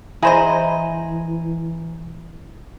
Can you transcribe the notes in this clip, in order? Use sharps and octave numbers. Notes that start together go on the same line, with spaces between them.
E3 E4 G#4 C5 D#5 G#5 A#5